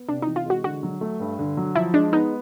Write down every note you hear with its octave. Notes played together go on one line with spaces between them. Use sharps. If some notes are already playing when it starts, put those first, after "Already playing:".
Already playing: B3
C3 D4
E3 D#4
F4
G#3 F#4
D3 F#4
F#3
A3
G2
D3
F#3
F3 E4
G#3 D4
B3 D#4